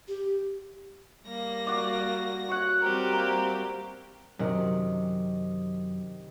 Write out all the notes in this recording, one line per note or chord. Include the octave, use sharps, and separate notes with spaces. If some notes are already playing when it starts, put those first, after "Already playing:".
G4
G3 A#3 A#6
F#4 D5
F#4 C#5 F#5
G3 C4 G4 A#4
A#3
F#2 C3 D#3